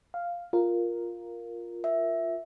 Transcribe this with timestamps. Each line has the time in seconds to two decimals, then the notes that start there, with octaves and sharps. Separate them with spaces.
0.14 F5
0.53 F4 A#4
1.84 E5